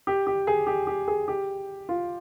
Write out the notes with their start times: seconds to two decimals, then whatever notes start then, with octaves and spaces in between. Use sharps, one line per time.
0.07 G4
0.27 G4
0.47 G#4
0.67 G4
0.87 G4
1.08 G#4
1.28 G4
1.89 F4